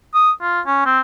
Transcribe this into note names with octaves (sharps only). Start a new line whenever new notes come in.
D#6
F4
C#4
C4